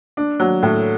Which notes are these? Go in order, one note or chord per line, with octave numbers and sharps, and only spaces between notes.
D4
F#3
A2